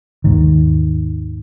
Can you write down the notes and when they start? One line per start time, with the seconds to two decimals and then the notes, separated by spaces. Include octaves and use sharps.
0.24 D#2 G#2 D#3